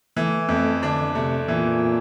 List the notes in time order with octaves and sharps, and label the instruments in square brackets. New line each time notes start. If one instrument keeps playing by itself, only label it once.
[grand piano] E3 [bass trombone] A3
[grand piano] F2 [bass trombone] A3
[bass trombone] D3 [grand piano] D4
[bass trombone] C3 [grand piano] A3
[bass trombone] A#2 [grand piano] E3